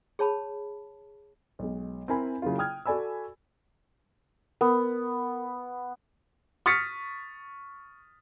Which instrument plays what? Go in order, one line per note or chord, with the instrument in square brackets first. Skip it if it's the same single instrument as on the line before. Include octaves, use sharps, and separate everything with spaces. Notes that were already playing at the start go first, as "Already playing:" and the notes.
[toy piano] G#4 C#5 A5 B5
[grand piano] B1 G#3
C4 E4 A#4 G#5 B5
C#3 F#3 A#3 E4 F4
G5 D#6 F6 G#6
F#4 A4 D5 G#5 B5 E6
[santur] B3 [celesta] A#4
[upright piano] C#6 D#6 F6 A6 B6 C#7